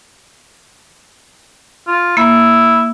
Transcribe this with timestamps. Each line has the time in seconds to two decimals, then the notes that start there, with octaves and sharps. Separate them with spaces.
1.87 F4
2.17 A#3 E4